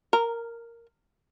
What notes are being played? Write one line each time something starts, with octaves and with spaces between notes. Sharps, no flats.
A#4